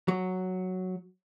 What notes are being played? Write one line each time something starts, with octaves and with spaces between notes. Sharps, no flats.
F#3